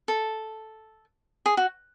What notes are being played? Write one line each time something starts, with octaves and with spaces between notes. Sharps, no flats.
A4
G#4
F#4